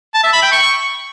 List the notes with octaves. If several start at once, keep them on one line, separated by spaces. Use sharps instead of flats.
A5
E5
B5
G5
C#6